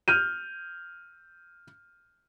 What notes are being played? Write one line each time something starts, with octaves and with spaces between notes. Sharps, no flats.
F6 G6 D#7